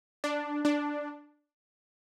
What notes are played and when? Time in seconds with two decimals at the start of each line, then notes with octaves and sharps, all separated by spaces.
0.24 D4
0.65 D4